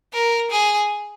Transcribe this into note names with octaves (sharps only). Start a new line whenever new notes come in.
A#4
G#4